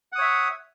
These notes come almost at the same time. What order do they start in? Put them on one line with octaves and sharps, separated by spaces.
F#5 D#6 C#5 E5